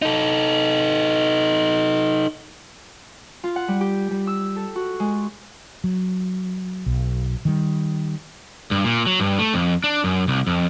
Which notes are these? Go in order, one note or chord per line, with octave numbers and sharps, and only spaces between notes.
D#4 A4
F4
F#5
G3
G4
G3
E6
A4
F#4
G#3
F#3
B1
D#3 G3
G2
A#2
F#3
G2
A3
F2
D4
F#2
C2
F2